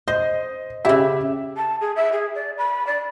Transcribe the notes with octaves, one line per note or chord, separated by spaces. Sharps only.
C5 D#5
C#3 E4 G4 E5
A5
G#4
E5
G#4
D5
B5
D5